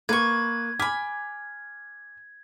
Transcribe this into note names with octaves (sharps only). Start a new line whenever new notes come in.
A#3 B4 C#6 G#6
G#5 B5 D6 F6 B6